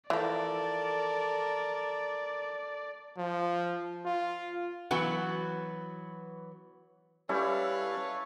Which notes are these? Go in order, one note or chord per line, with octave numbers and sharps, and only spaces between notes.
E3 F3 A4 A#4 D5
F3
F4
E3 F#3 B3 F#4
G3 C#4 E4 A4 B4 C#5 E5 F5